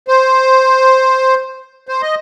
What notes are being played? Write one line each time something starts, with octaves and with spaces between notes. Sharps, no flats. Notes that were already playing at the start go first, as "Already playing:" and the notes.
C5
C5
D#5